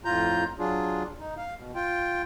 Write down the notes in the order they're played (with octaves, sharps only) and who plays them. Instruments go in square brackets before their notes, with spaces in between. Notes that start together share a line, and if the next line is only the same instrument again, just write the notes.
[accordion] F2 A2 F4 A#5 G6
F#3 D4 F4 G#4
D#4
F5
B2
F4 G5